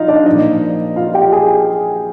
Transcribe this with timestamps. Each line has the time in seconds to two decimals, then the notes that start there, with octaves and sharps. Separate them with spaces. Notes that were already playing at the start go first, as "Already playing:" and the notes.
Already playing: F3 D#4 F4 D#5 F5
0.08 D4 D5
0.26 A#2 F3 D#4 D#5
0.96 F4 F5
1.14 G4 G5
1.32 G#4 G#5